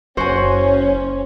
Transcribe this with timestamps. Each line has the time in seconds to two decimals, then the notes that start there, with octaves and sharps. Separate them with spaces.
0.17 F#1 C#4 F#4 C5 G#5